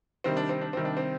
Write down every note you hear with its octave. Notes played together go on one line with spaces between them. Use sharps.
C3 D#3 G3 C4
D4
C4
D4
C3 D#3 G3 C4
D4
C4